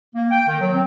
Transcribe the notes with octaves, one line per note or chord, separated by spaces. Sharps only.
A#3
G5
D#3
F#3
C4